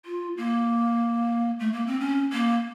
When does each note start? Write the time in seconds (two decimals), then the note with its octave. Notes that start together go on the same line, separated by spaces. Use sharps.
0.06 F4
0.37 A#3
1.60 A3
1.73 A#3
1.87 C4
2.00 C#4
2.33 A#3